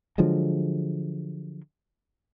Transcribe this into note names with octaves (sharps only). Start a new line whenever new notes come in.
D3 F3 F#3 G#3